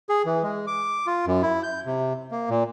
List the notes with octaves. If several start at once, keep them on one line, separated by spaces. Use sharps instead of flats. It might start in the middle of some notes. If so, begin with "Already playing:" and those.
G#4
E3
G#3
D6
F4
F#2
E4
G6
C3
A#3
A#2